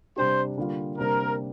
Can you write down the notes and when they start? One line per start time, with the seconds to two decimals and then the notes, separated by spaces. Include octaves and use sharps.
0.17 C3 G3 D4 G4 C5
0.57 D3 G3 A#3 F4
0.98 C3 G3 A#3 D4 A#4